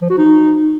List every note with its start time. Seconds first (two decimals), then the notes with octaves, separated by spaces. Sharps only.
0.02 F3
0.10 F#4
0.18 D#4